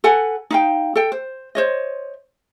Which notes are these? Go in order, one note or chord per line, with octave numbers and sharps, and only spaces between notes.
A4 B4 F#5 G#5
D#4 F5 G5
A4 G5
C5
C5 C#5 D#5